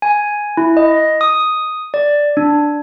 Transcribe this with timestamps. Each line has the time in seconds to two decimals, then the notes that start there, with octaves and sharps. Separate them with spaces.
0.02 G#5
0.57 E4
0.77 D#5
1.21 D#6
1.94 D5
2.37 D4